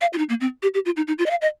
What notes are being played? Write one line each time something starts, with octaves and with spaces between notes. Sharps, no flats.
F5
F4
D#4
A#3
C4
G4
G4
F4
D#4
D#4
F4
D#5
F5
D#5